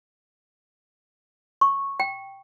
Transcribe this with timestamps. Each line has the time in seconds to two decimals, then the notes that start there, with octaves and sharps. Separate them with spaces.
1.61 C#6
2.00 G5